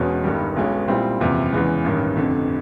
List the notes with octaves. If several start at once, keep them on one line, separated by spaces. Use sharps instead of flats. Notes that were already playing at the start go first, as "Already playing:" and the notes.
Already playing: E1 E2 B2 G#3 C#4
G1 G2 D#3 G3
B1 B2 G#3 C#4
A#2 G3 C4 E4
F#1 E2 C3 F3
E2 C#3 E3 G#3
A1 G2 D#3
F1 F2 D3